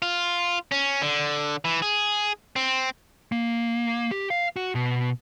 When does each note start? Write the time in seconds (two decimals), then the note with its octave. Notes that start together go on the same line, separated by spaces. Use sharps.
0.02 F4
0.72 C#4
1.02 D3
1.65 E3
1.82 G#4
2.56 C4
3.32 A#3
4.11 G4
4.31 F5
4.56 F#4
4.75 B2